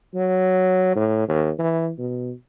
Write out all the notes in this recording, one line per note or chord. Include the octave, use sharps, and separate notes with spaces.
F#3
A2
D#2
E3
B2